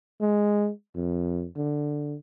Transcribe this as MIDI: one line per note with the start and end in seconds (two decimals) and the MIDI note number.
0.21 0.70 56
0.95 1.46 41
1.57 2.15 50